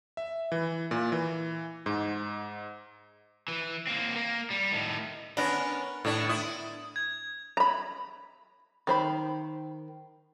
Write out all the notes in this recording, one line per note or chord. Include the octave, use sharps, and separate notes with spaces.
E5
E3
A#2
E3
G#2
E3
A#3 C4
A#3
G3
A2 D#3
B3 C#4 D4 A#4
A2 A3 D4
E4 D#6
G#6
A#5 B5
D#3 C5 B5